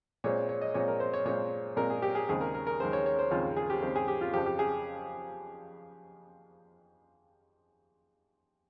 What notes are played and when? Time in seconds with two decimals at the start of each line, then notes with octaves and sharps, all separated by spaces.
0.24 A#2 G#3 C4 C#5
0.49 C#5
0.62 D#5
0.74 A#2 G#3 C4 C#5
0.88 A#4
1.00 C5
1.14 C#5
1.25 A#2 G#3 C4 C#5
1.77 A#2 G#3 C4 A#4
1.90 G#4
2.02 G4
2.15 G#4
2.29 D#2 C#3 G#3 C4 G#4
2.41 A#4
2.54 A#4
2.67 A#4
2.80 D#2 C#3 G#3 C4 C5
2.93 C#5
3.06 C#5
3.19 C5
3.31 D#2 C#3 G#3 C4 F4
3.57 G#4
3.70 G4
3.82 D#2 C#3 G#3 C4
3.96 G#4
4.08 G4
4.21 F4
4.33 F2 C#3 F3 G4
4.46 G4
4.59 G#4